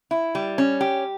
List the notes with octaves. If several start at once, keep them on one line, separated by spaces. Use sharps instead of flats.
E4
G3
C#4
G4